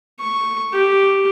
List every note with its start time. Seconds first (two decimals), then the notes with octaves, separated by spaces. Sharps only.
0.20 C#6
0.72 G4